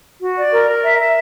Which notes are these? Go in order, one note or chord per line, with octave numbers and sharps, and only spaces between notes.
F#4
D5
A#4
A#4
E5
E5